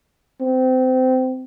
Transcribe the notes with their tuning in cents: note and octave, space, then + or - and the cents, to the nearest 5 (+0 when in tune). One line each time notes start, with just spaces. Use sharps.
C4 -25